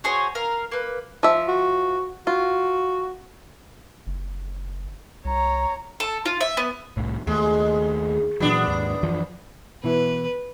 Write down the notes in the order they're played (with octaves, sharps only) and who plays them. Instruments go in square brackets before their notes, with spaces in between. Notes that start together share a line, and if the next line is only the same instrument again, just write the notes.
[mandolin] F#4 G#4 C5 C#5
A#4 F5
A#3 B4
[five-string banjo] F3 E5
[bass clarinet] F#4
[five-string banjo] F4 [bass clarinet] F#4
[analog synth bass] F#1
[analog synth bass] C2 [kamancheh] C#5 A#5
[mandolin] A4
F4
E5
B3
[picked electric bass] C2 A2
[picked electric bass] D#2 A3 [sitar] G#3
[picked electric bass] A#2 E3 F#3 [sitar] B3 D4
[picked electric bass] D#2 G#2
F#2 E3 F3
[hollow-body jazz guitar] B2 E3 E4 [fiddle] B4